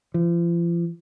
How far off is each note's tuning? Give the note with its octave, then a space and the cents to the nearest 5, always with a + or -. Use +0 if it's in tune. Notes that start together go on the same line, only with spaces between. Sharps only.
F3 -40